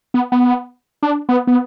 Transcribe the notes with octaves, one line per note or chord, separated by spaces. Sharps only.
B3
B3
D4
B3
B3